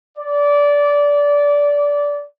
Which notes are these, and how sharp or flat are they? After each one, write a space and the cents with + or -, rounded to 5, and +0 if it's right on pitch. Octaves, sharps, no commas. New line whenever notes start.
D5 -20